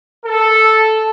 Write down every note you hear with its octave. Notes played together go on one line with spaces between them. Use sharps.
A4